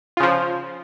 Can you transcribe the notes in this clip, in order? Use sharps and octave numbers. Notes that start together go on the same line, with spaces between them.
C#3 F3 F4